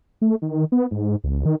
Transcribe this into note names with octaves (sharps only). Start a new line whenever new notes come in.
A3
D#3
B3
G#2
C#2
D#3